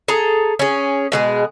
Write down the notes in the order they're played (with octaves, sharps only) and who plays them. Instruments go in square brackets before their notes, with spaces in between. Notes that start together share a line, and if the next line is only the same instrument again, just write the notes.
[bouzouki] G#4 A4 A#5
C#4 G#4
B2 G#3 G#4